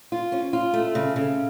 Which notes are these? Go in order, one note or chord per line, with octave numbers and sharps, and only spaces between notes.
F4
C#4
F4
A3
C#3
C#3